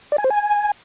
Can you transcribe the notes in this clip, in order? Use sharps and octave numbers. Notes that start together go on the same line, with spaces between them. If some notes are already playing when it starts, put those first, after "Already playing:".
D5
G#5
C5
G#5